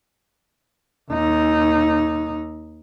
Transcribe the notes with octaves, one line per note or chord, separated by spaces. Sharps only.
D#2 D#4